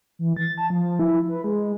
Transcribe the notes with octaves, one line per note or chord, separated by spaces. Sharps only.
E3
A6
A5
F3
E4
B4
G#3